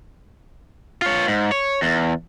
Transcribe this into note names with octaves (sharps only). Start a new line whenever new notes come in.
F4 C#5
G#2
C#5
E2